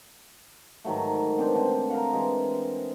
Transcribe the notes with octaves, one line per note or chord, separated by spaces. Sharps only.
G#2 D#3 F#3 A3
B3 C4 D4 C5
D3 C4 D4 D#5
A#4 C5 F5 F#5
E3 G#3